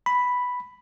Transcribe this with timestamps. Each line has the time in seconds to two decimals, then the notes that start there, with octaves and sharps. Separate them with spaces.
0.06 B5